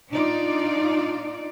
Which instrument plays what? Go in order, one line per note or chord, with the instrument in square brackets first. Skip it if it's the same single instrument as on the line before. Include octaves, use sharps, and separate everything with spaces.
[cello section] D4 D#4 F4 D5